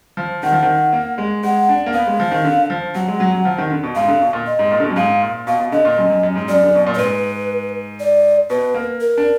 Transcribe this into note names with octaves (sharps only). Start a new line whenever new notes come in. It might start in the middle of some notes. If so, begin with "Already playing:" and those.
F3
D#3 F#5
F3
D#3
A#3
G#3
G#3 F#5
D4
A#3
B3 F5
G#3
F3
D#3
D3
F3
F#3 F#5
G#3
F#3
F#3
F3
D#3
D3
B2
G#2 F5
D3
B2
A#2
D#5
G#2
A#2
D3
B2
F#2
G#2 F5
A#2
B2 F5
B2
D3 D#5
A#2
F#2
F#2
F#2
G#2
F#2 D5
D3
B2
A#2
D5
G#2 B4
D5
B2 B4
A#3
A#4
D4